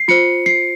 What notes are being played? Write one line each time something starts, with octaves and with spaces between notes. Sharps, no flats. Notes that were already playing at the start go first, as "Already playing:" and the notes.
Already playing: C7
F4 C5 C#7
C7